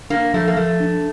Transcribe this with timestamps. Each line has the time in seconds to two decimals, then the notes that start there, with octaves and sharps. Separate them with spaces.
0.10 A#3 D4
0.34 F3 A3
0.48 A#3
0.57 F3 A3
0.80 D4